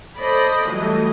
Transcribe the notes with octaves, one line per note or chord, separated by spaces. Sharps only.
A4 C5 D5 D#5 B5
E3 F#3 G3 A3 D#5